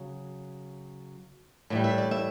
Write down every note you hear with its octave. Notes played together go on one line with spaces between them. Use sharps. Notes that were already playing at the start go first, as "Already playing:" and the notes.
Already playing: C#3 F#3
A2 E3 G3
E5
D5
E5